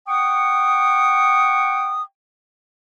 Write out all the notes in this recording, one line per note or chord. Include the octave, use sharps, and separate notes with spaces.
F#5 G5 C#6 D#6